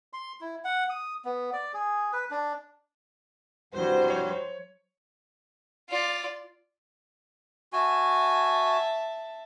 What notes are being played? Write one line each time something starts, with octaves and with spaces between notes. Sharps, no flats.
C6
E4
F#5
D#6
B3
D5
G#4
B4
D4
C2 G2 B2 F#3 F#4 C5
C#5
F4 D5
F#4 E5 G#5 A5